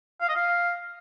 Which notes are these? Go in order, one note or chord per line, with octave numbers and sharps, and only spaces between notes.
F5
D#5
F5